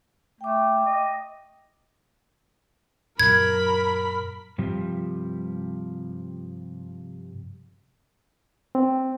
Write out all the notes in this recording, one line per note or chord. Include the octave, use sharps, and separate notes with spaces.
A3 G5 D6
D#5
F#2 A#2 F#3 A#4 B5 G#6
G2 C3 F3 G3
C4